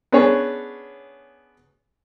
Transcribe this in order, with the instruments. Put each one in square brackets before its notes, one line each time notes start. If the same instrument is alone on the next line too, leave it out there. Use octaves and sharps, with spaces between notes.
[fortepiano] B3 C#4 D4 G#4 C#5